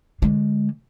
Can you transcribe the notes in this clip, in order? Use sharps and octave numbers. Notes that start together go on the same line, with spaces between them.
D3 G#3